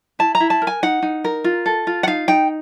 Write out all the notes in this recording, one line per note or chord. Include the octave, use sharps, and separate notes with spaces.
E4 A5
A#5
E4
A5
A#4
G#5
D#4 F#5
D#4
A#4
F4
A4
F4
F#5
D#4 F5
D#4 G5